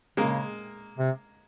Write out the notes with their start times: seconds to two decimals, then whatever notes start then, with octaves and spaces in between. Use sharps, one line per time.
0.17 C#3 G#3 A#3
0.98 C3